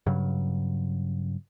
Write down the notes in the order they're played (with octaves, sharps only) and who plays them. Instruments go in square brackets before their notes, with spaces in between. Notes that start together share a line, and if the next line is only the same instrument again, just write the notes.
[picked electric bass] G2 C#3 F#3